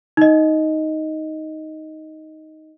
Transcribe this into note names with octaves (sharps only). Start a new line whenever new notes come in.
D#4 D#5